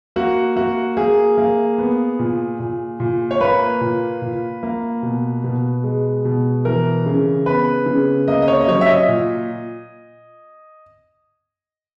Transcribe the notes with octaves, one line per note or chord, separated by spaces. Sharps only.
A#3 F#4
A#3 F#4
A#3 G#4
A#3
B3
A#2
A#2
A#2
C#5
A#3 B4
A#2
A#2
A#3
B2
B2
G#3
B2
E3 A#4
C#3
B3 B4
C#3
A#3 D#5
D#5
C#5
D#5
F#3 C#5
E5
D#5
A#2